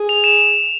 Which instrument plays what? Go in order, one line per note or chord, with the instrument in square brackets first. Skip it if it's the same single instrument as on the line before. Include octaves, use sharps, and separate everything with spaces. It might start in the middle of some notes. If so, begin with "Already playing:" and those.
Already playing: [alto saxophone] G#4
[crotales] F7
E7